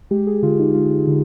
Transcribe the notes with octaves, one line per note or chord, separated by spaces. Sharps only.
G#3 G4
G#4
D3 F4
D#4
G#3 F4
D3